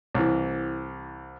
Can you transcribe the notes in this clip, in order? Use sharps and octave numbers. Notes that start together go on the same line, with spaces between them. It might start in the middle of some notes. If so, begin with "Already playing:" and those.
C2 E3